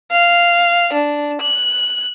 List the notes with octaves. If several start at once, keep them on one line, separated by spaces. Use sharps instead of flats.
F5
D4
F#6